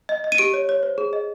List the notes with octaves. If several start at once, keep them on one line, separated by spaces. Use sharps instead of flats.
D#5
D#5
D#7
G4 D7
C#5
C#5
C5
G#4
D#5